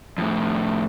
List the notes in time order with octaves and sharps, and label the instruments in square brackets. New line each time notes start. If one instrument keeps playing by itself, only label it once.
[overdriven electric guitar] F2 A2